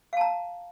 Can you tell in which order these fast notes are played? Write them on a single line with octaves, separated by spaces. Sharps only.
F5 A5 A#5